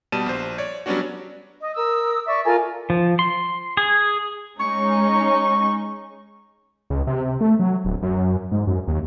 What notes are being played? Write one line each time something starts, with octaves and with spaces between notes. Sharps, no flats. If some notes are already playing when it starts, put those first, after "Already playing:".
B2 G3 A5 D#7 E7
A#1 C5
C#5 D5
F#3 G3 B3 C#4 D4 F#4
D#5
A#4 D#6 E6
D5 E5 C#6
F4 A4 A#4 G#5
F3
C6
G#4
G#3 C#4 D#4 C#6
C#2
C3
A3
F#3
D1
F#2
G#2
F#2
D#2